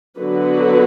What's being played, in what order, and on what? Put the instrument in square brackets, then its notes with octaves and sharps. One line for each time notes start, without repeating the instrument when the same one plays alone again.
[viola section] D3 F#3 B3 F#4 B4